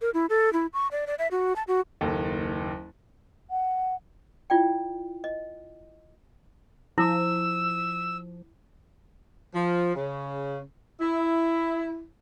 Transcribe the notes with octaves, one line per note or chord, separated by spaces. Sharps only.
A#4
E4
A4
E4
C#6
D5
D5
E5
F#4
A5
F#4
F#1 D#2 A4
F#5
E4 F4 D5 G5
D#5
F3 E4 E6
F3
C#3
E4